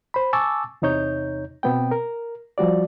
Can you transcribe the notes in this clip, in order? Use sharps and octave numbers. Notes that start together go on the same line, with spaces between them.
C5 B5
G#5 A5 C#6 D6 E6 A6
E2 C3 D#4 C#5 G6
B2 B3 C4 G5
A#4
F3 G3 F#4 D5